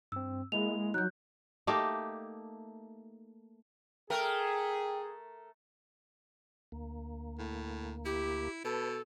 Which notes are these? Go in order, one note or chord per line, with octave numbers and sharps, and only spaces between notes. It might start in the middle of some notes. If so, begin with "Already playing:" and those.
G2 C4 E6
G#3 A#3 E4 F7
F#3 D#4 F#6 G6
A3 A#3 D#4 G4
A3 G#4 A#4 G5
D2 A#3
A2
E4 G4
B2 A4 B4 A5